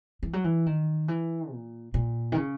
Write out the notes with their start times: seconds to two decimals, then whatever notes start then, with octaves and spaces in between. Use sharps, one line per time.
0.23 E3
0.33 F#3
0.44 E3
0.66 D#3
1.08 E3
1.52 A#2
1.94 A#2
2.32 D#3
2.37 C#3